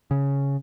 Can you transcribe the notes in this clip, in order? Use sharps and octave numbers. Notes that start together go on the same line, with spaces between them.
C#3